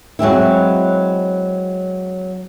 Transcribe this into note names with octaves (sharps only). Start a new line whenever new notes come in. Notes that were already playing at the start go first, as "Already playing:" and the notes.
F#3 G#3 C4 E4